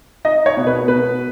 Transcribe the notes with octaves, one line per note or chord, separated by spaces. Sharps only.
D#4 D#5
C#5
B2
B4
B2 B4